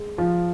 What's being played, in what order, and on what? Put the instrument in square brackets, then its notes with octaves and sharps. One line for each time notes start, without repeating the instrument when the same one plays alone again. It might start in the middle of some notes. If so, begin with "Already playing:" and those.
Already playing: [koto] G#3
[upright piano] F3